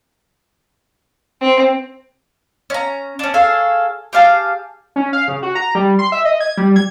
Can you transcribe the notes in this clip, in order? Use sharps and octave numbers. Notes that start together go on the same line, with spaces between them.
C4
C#4 A#5
C#4 D4
G#4 A4 C#5 F5
G4 G#4 F5 A5
C#4
F5
C#3
F#4
A#5
G3
C6
E5
D#5
G#6
G3
G#6